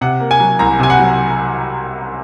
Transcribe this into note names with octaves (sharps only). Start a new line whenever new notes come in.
C3 F#5
A#3
G#5
F#3
C2 A#5
C3 G#5
F#5
F#3